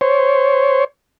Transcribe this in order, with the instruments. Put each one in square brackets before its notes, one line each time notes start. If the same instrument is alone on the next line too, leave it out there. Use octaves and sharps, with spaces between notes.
[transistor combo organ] C5 C#5